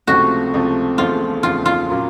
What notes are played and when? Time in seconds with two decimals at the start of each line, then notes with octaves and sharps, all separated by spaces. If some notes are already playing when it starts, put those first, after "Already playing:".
0.07 C#2 C3 F3 A3 F#4
0.54 C#2 C3 F3 A3
0.98 E1 E2 C#3 F3 A3 F4
1.43 E1 E2 C#3 F3 A3 F4
1.66 F4
1.90 A#2 F#3 A#3 C#4